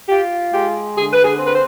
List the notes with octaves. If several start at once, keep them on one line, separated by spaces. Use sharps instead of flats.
F4 G4
G#3 G4
D3 G#4
B4
G#4
C4
B4
C5